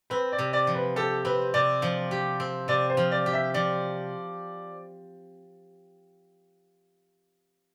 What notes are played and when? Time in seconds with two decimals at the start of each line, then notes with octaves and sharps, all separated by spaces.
0.10 C4 B4
0.32 D5
0.39 C3
0.53 D5
0.67 F3
0.75 B4
0.96 G4 A4
1.25 C4 B4
1.54 C3 D5
1.82 F3
2.11 G4
2.40 C4
2.68 C3 D5
2.90 C5
2.97 F3
3.12 D5
3.26 G4
3.33 E5
3.54 F3 D5